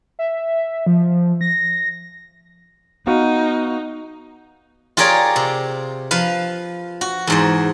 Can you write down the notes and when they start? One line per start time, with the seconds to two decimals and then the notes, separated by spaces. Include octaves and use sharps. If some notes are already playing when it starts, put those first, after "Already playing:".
0.19 E5
0.87 F3
1.41 A#6
3.07 B3 D#4 F#4 F5
4.97 F4 G4 G#4 A#4 C#5 D5
5.36 C3
6.11 F3 B4 F5
7.01 F#4
7.27 E2 G#2 C5